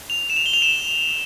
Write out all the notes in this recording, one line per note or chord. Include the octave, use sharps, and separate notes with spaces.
F7
E7
F7
G7
F7
E7